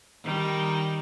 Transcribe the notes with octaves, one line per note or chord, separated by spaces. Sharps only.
D#3 G3